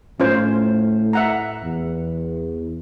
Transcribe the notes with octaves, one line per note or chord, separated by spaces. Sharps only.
A2 C#4 F4 C5
E5 F#5 A#5
E2